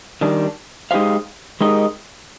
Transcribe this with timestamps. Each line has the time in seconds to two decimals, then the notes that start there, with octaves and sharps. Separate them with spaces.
0.21 D#3 G3 D4
0.91 G#3 D#4 G4 C5 F5
1.61 G#3 D#4 G4 A#4 D#5